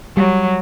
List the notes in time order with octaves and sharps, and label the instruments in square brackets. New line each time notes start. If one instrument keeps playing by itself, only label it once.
[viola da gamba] F#3 [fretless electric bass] G3